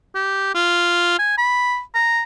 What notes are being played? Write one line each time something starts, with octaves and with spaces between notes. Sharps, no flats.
G4
F4
G#5
B5
A#5